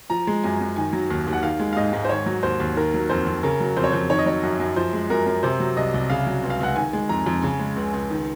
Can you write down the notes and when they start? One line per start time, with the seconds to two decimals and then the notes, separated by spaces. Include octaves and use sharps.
0.10 F3 A#5
0.27 G#3
0.44 F#2 G#5
0.60 F#2
0.76 D#3 G#5
0.93 F#3
1.10 D#2
1.27 D#2
1.33 F#5
1.43 D#3 F5
1.59 G#3
1.73 F5
1.76 G#2 D#5
1.93 G#2
2.05 C5
2.09 D#3 C#5
2.26 F#3
2.43 D#2 C5
2.60 D#2
2.76 D#3 A#4
2.94 F#3
3.09 F2 C5
3.27 F2
3.43 C#3 A#4
3.60 F#3
3.77 F2 C5
3.84 C#5
3.92 F2 C5
4.10 D#3 C#5
4.19 D#5
4.26 F#3 C#5
4.43 F#2
4.60 F#2
4.76 F3 C5
4.93 G#3
5.10 F#2 A#4
5.26 F#2
5.43 C3 C5
5.60 F#3
5.77 C2 D#5
5.94 C2
6.10 C#3 F5
6.26 F#3
6.43 C#2
6.50 F5
6.60 C#2 F#5
6.76 D#3 G#5
6.93 G#3
7.09 F2 A#5
7.26 F2
7.42 C#3 G#5
7.59 G#3
7.76 C#2
7.94 C#2
8.10 D#3